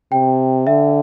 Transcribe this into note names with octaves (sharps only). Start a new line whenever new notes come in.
C3 G5
D3 E5